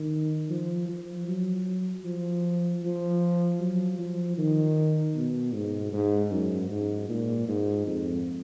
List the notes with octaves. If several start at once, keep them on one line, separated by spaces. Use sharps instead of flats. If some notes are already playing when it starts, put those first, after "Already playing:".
Already playing: D#3
F3
F3
F#3
F3
F3
F#3
F3
D#3
B2
G#2
G#2
F#2
G#2
A#2
G#2
F2